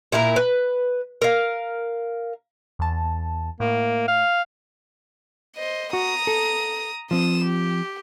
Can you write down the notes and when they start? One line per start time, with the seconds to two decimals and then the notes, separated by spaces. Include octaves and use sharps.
0.12 A#2 E4 A#4 A#5
0.36 B4
1.22 A#4 F5
2.79 E2 A5
3.60 A2 A#3
4.08 F5
5.56 C5 D#5
5.93 F#4 A#5 D#6
6.27 A4
7.11 F3 C4 D#6 E7
7.44 G4